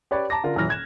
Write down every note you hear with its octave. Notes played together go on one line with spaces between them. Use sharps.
G4 B4 C#5 D5
A5 A#5 D6 A#6
D3 F4 A#4
D#1 F#2 E3 F6 A#6
F#6 G#6 E7